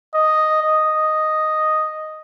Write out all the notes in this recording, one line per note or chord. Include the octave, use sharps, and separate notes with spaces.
D#5
D#5